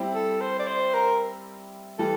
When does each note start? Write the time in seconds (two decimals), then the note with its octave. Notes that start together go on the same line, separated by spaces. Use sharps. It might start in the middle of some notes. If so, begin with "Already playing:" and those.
Already playing: G3 C4 E4 G4
0.15 A4
0.41 C5
0.59 D5
0.67 C5
0.94 A#4
1.99 E3 G3 A4